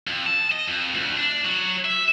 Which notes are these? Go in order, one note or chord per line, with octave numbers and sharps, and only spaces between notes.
F2
A5
D#5
F2
D2
D4
F#3
E5